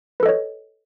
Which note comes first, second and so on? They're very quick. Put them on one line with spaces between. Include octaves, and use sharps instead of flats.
B4 A4 D#5 C#5